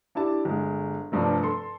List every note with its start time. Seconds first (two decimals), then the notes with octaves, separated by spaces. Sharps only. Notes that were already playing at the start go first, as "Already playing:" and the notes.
0.15 D4 E4 G4 A5
0.45 G1 G#3
1.12 F1 G2 F3 A3 D4
1.43 A4 C6